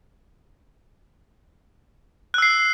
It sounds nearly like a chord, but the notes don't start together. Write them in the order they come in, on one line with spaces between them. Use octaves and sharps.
F#6 E6 C7